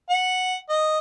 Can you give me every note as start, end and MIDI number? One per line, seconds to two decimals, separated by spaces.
0.10 0.57 78
0.69 0.99 75